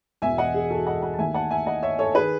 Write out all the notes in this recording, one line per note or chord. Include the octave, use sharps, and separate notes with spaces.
E1 E2 B2 E5 G#5
D#5 F#5
G#4
F#4 A4
D#5 F#5
D#5 F#5
A5
D#2 D#3 A3 E5 G#5
F#5 A5
E5 G#5
D#5 F#5
C#5 E5
A4 C#5
D#3 G#4 B4